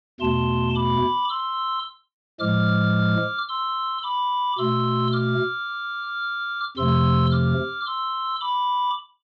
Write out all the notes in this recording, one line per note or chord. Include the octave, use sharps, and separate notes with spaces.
E2 B2 A3 A5 C6
B5 D6
C6 E6
A2 F3 G#3 D6 F6
C6 E6
B5 D6
B2 A3 C6 E6
D6 F6
F2 C3 F3 A3 C6 E6
D6 F6
C6 E6
B5 D6